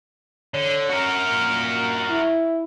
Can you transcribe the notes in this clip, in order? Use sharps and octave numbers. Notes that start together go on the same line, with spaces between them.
D3 C#5
F#4 A#4
A#2
E4